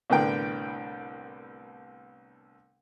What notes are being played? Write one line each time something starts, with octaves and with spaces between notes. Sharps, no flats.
C2 A2 D3 B3 A#4 G5